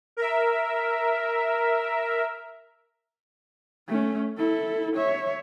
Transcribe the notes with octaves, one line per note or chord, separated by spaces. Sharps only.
A#4 E5
A3 C#4
E4 A4
C#5 E5